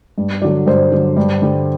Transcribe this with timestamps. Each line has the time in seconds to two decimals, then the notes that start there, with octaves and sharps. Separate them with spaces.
0.18 G2
0.42 D3 F#3 D5
0.66 G2 C5
0.92 D3 F#3
1.17 G2
1.42 D3 G3